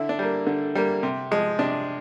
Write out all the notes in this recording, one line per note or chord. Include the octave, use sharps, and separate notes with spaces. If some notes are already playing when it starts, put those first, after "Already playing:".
Already playing: D3 E4
D4
G3 A#3
D3
G3 A#3
C3
F3 G#3
C3 D4